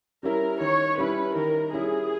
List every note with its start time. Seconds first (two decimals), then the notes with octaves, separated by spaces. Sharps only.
0.23 G3 C#4 E4 A#4
0.60 D#3 C#5
0.98 G3 C#4 E4 B4
1.35 D#3 A#4
1.73 G3 C#4 E4 G#4